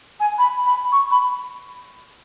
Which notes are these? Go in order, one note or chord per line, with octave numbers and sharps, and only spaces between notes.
G#5
B5
B5
C#6
B5